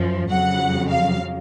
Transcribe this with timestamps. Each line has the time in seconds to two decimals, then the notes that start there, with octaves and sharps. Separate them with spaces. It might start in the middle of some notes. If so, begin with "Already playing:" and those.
Already playing: F#2 F3
0.29 F2 C#3 F#3 F#5
0.89 F5